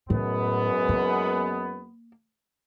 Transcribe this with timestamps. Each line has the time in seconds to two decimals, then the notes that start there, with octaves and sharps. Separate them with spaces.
0.10 F#2 A2 G#3 B3
0.89 A#3